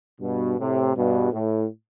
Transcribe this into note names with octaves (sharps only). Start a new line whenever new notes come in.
G2 B2
A2 C3
G2 B2
A2